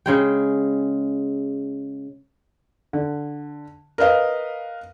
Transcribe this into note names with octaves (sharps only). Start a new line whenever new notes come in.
C#3 G#3 G5
D3
A#4 B4 D#5 F5